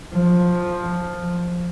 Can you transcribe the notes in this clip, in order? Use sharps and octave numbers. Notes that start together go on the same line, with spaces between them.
F3